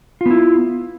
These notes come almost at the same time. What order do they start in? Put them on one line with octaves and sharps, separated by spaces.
F4 B3 E4